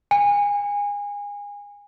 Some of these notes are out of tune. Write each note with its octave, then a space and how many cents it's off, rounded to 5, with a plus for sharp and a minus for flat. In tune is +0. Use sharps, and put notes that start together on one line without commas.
G#5 -30